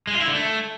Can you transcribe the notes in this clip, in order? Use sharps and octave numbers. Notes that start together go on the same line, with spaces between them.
G#3
F4
E4
D3
A3